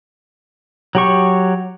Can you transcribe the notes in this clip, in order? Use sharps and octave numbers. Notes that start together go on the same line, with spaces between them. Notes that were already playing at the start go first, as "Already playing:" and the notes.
F#3 G4 C#6